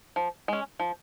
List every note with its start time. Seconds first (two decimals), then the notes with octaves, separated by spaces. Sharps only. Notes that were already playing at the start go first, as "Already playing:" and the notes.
0.16 F3
0.48 G#3 C#4
0.79 F3